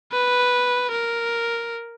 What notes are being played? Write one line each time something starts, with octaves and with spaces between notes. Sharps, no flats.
B4
A#4